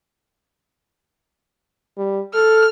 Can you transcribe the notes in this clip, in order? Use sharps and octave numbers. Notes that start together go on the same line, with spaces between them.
G3
A4 F6